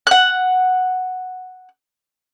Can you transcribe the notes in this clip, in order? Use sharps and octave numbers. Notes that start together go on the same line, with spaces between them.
F#5 F#6